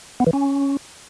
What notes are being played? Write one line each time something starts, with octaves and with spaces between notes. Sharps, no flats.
B3
E3
C#4